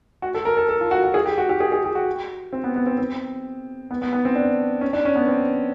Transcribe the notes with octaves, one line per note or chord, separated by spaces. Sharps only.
F#4
A4
A#4
A4
A4
F4
F#4
F#4
G#4
G4
F#4
G4
G#4
G#4
G4
F#4
C4
B3
B3
C4
C4
B3
B3
B3
C4
D4
C#4
D4
C#4
B3
C4